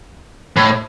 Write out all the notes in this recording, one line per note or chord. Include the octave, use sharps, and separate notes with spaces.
A2